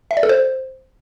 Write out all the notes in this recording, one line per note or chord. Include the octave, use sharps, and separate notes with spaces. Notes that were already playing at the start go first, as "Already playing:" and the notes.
E5
D5
A4
C5